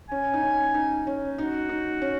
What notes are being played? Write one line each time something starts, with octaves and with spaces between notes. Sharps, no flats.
C#4 G#5
D#4
C#4
D#4
C#4
D#4 F#4
D#4
C#4